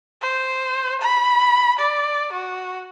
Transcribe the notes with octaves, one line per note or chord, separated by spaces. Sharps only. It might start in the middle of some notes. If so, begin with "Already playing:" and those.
C5
B5
D5
F#4